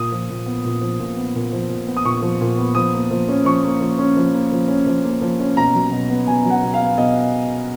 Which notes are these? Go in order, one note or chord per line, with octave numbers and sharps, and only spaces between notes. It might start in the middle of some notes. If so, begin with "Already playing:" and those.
Already playing: A#2 D#6
F3
A#2
B3
A#2
F3
A#2
B3
A#2
F3
A#2
B3
D#6
A#2 C#6
F3
A#2
B3
F3 D#6
A#3
F3
C#4
F3 C#6
A#3
F3
C#4
F3
A#3
F3
C#4
F3
A#3
F3
C#4
B2 A#5
F#3
B2
B3
B2 G#5
F#3
F#5
B2
F5
B3
B2 D#5